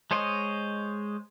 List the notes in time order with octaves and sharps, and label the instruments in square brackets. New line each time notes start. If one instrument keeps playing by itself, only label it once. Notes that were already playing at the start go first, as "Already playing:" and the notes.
[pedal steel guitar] G#3 C5 C#5 D#5